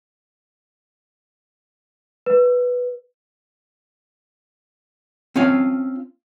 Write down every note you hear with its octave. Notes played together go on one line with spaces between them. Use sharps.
B4
C4 C#4 F4 F5